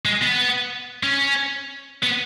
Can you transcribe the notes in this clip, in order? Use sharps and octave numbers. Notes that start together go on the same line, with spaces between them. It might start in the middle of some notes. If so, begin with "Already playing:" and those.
G#3
B3
C#4
B3